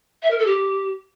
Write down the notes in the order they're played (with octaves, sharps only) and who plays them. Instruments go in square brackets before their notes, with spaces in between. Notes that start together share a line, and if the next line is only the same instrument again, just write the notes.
[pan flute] E5
A#4
A4
G4